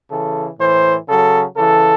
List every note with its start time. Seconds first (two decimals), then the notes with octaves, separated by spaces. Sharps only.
0.11 C#3 E3 A4
0.60 A2 E3 C5
1.08 C#3 F#3 A4
1.56 C#3 E3 A4